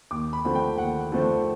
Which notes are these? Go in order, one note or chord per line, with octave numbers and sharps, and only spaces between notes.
D#2 D6
B5
D3 F3 A3 C4
G5
D#2 F#5
D3 F3 A3 C4